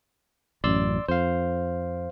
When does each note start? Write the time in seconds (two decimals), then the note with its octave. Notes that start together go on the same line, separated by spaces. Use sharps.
0.64 A1 F#2 D5 C6 E6
1.08 F2 C5 F5